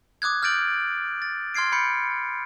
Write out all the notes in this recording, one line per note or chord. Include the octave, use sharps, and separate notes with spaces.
D6 D#6 F#6 G#6
F6 G6 A6 D7 F#7
A6
C6 F6 G#6 C7 D7
B5 G6 C#7